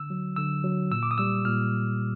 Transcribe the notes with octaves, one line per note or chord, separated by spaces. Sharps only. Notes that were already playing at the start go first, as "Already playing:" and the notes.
Already playing: D3 E6
F#3
D3 E6
F#3
A#2 E6
D6
D#6
G3 E6
A#2 F6